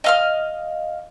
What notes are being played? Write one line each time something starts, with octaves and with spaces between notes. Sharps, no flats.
D#5 F5 F6